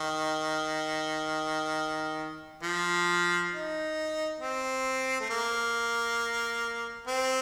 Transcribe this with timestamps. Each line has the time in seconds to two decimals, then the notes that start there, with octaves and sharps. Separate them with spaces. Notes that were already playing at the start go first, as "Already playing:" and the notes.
Already playing: D#3
2.63 F3
3.53 D#4
4.40 C4
5.20 A3
5.30 A#3
7.07 C4